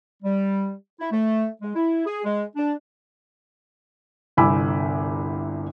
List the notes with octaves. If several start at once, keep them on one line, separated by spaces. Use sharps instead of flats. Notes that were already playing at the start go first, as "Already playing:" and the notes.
G3
E4
A3
G#3
E4
G#4
G#3
D4
G1 C2 G#5 B5 D6 E6